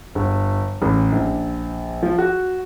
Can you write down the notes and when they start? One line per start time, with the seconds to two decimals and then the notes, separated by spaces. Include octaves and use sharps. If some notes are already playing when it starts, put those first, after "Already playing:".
0.15 G1
0.82 A1
1.12 A#1
2.03 F3
2.18 F#4